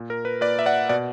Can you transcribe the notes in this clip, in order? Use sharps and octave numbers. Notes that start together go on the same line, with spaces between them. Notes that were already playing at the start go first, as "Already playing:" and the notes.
Already playing: A#2
A#4
B4
A#2 B4 D5
E5
D5 F#5
B2 D5 F#5